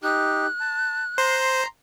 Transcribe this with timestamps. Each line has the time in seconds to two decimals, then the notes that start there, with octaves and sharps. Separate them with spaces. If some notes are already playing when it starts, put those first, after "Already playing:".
0.03 D#4 G4 F#6
0.60 A5
1.18 C5 A#5 C6